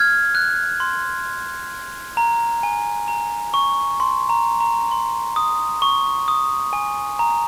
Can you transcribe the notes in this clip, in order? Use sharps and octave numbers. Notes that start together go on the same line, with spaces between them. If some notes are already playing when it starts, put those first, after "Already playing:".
Already playing: F6 G#6
F#6
C6
A#5
G#5
A#5
C#6
C6
A#5
A#5
C6
D#6
C#6
D#6
G#5
A#5